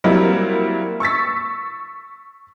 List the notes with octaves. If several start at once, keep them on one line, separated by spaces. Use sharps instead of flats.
F#3 G3 A#3 C4 E4
C#6 E6 A6 B6